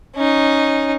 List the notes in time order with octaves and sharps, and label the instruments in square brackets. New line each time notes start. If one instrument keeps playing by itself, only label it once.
[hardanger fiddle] C#4 D#4